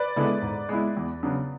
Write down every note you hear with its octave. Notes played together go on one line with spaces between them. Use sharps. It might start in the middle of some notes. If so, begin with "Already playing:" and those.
Already playing: B4 D5
D3 G#3 B3 E4
G#2
G#3 B3 E4
E2
C#3 F#3 B3 D4